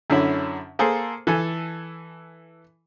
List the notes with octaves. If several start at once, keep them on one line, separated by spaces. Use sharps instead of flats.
F#2 D3 C#4 E4
A#3 G#4 A4 C5
E3 A4 G#5